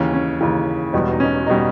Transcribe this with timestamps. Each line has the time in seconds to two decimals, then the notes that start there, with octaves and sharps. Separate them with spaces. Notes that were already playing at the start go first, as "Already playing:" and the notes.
Already playing: D#2 C#3 E3 C#4
0.14 C#4
0.41 D#2 C#3 E3
0.93 E1 E2 B2 G3
1.11 D#4
1.20 C#4
1.47 B2 G3 D#4